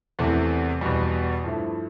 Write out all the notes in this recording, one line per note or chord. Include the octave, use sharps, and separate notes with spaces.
E2 C3 E3 A3
E2 B2 G3
G2 F3 A3 E4